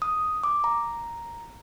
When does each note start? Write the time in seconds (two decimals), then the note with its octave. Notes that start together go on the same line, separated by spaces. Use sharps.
0.02 D#6
0.44 D6
0.64 A#5